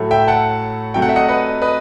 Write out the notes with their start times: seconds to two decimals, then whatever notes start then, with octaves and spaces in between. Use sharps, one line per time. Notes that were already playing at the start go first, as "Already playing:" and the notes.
Already playing: A2 F#3 A3
0.11 E5 G5
0.28 F#5 A5
0.94 C3 F#3 A3 G5
1.02 F#5
1.09 E5
1.16 D#5 F#5
1.29 B4 D#5
1.62 B4 D#5